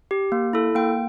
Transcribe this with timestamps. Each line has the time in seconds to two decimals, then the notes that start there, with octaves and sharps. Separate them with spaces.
0.11 G4
0.32 A#3
0.53 E4 A4
0.75 A#3 G5